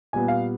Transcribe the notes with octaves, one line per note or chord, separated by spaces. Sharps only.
A#2 G3 B3 G#5
F5